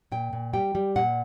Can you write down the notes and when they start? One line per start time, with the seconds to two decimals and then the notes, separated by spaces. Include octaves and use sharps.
0.12 A#2 G5
0.33 A#2
0.53 G3 G5
0.75 G3
0.96 A#2 F#5